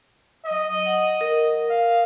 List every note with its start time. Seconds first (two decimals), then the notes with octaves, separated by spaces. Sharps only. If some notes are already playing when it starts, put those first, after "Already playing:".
0.46 F#3 D#5 D#6
0.86 F#5
1.21 A#4
1.69 F5